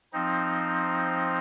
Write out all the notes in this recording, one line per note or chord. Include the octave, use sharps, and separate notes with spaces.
F3 C4 D#4